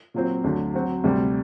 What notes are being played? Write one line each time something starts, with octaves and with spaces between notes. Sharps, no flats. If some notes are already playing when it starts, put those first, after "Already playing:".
A#2 F#3 C4
D2 D3 F#3
F#3 C4 F#4 C5
D2 C3 G3